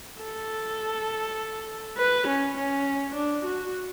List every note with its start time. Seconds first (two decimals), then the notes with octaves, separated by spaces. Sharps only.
0.22 A4
1.97 B4
2.28 C#4
2.57 C#4
3.15 D4
3.45 F#4